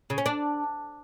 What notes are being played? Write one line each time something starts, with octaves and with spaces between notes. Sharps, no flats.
C#3
C#4
D4